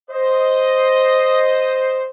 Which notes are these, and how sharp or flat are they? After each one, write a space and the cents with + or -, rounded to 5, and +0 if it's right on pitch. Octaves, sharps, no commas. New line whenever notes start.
C5 +0 D#5 +0